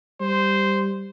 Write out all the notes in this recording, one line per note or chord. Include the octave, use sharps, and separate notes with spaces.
G3 C5